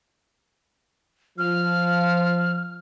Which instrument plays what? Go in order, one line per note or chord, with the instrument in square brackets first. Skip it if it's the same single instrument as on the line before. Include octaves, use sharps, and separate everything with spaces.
[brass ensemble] F3 [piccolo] F6